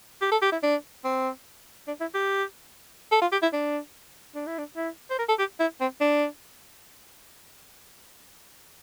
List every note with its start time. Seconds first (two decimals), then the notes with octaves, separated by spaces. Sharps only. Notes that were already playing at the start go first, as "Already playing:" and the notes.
0.22 G4
0.32 A4
0.42 G4
0.52 E4
0.63 D4
1.04 C4
1.88 D4
2.01 E4
2.14 G4
3.12 A4
3.22 F4
3.32 G4
3.42 E4
3.53 D4
4.35 D4
4.47 E4
4.58 D4
4.76 E4
5.10 C5
5.19 A#4
5.29 A4
5.39 G4
5.60 E4
5.80 C4
6.01 D4